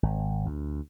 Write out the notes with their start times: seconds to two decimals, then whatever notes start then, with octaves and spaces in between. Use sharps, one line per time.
0.03 G#1
0.46 D2